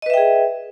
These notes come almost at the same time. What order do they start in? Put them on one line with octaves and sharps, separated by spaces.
D#5 B4 E5 G5 G#4